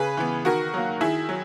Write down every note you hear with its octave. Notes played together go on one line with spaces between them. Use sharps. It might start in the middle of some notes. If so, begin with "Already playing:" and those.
Already playing: C#3 G#4 B4
E3 B3
D#3 F#4 A#4
F#3 A#3
D#3 E4 G#4
F#3